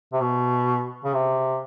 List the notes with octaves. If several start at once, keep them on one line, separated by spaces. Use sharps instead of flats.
C3
B2
C#3
C3